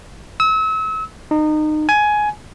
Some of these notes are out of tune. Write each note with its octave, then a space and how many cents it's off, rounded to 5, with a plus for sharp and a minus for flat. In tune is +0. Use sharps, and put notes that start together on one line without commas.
E6 -35
D#4 -25
G#5 +15